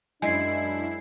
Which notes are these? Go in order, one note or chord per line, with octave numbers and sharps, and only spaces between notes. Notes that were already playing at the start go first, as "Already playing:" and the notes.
F#2 G#3 D4 E4 G#5 G#6 C7